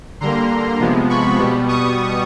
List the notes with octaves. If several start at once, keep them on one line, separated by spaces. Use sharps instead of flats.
D3 G3 A#3 A#5 C6
C3 F3 G#3 B3
B5 C#6
B2 G3 B3
C#6 D#6